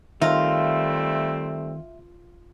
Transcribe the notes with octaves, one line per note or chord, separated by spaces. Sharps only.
D#3 G3 A3 C4 F4 E5 A#5